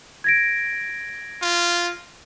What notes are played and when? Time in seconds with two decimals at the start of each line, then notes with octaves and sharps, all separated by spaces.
0.24 G#6 A#6 D7
1.42 F4